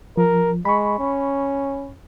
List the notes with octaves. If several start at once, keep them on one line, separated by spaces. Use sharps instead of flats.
F3 A#4
G#3 B5 C#6
C#4